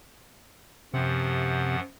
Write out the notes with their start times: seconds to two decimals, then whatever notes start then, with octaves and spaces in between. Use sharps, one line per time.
0.94 F#2 C3 F3 F#5